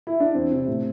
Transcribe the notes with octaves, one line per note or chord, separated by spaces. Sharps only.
E4
D4
E2 C4
C3 E3
A2